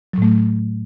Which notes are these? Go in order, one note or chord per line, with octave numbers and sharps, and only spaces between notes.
A2 F#3 A3